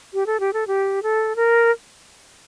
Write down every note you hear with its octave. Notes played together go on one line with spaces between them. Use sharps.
G4
A4
G4
A4
G4
A4
A#4